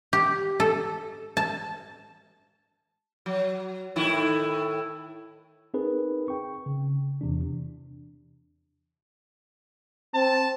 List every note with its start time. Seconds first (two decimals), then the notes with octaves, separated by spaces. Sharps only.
0.13 G4
0.60 A4
1.37 A5
3.26 F#3
3.96 A2 D#3 E4
5.74 C4 D#4 G#4 A#4 B4
6.28 G5 C#6
6.66 C#3
7.21 E2 C3 E3 D4
10.15 C4 A5